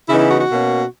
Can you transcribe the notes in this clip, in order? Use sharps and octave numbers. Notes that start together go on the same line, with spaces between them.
C#3 E3 B3 D#4 E4
E4
F#4
F#4
B2 A#3 C#4